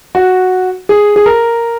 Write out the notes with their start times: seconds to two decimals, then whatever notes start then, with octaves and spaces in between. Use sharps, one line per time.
0.15 F#4
0.89 G#4
1.16 G#4
1.26 A#4